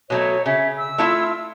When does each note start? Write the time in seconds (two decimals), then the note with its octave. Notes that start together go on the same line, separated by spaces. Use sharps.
0.10 B2 F#3 A3 C#5
0.46 C#3 E5
0.77 E6
0.98 A3 E4 F4